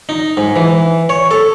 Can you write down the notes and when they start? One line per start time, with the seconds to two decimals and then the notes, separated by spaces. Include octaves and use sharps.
0.09 D#4
0.37 G#2
0.56 E3
1.09 C#5
1.31 A4